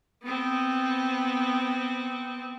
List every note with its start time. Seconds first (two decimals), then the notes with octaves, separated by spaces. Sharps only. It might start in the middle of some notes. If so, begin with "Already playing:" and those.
0.23 B3 C4